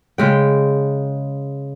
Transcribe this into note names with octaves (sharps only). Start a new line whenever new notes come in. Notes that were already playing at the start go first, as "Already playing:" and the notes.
C#3 G#3 G5